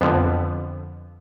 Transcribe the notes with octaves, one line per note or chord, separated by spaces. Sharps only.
F2 D3 F3 B3